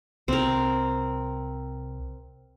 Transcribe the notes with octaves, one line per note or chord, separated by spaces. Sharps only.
C2 C4 A#4